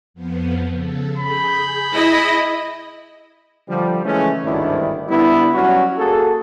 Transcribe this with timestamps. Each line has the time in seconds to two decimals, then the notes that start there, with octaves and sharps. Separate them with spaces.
0.14 F2 F3 B3
0.72 C#3 A4
1.17 G#4 B5 G6
1.93 E4 D#5
3.68 D3 F3 G3
4.05 C#3 E3 G#3 A3 C#4
4.44 G#1 D2 G2 D#3 D4 E4
5.09 D3 G3 B3 E4
5.54 F#3 G3 C#4 F#4
5.98 A#3 F#4 G#4 A4